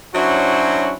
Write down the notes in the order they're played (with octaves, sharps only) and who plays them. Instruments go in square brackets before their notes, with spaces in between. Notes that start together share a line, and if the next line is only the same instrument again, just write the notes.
[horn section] F#3 C#4 D4 E4 F#4 C5